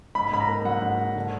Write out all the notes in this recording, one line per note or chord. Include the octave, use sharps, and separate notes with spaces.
G#2 B5
G#2 B5
A#5
A#3
F#3 F#5
G#2
G#2
D3